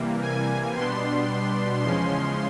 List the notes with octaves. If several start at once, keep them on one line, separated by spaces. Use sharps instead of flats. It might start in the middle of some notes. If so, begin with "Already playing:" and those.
Already playing: C3 E3 G3 A#3
G#5
B2 G3 B3 D4 C6
E2 C#3 F3 G#3 C#4 C6